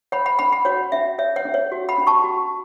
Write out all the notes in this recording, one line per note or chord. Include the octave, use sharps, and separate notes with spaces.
C#5 F#5 B5
F#5 B5
C#4 F#5 B5
F#5 B5
F#4 C#5 F#5
C#4 E5
C#5 E5
C#5 F#5
C#4
C#5
F#4
F#5 B5
C#4
A5 C#6
F#4